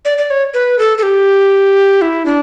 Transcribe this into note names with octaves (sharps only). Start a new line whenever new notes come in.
D5
D5
C#5
B4
A4
A4
G4
E4
D4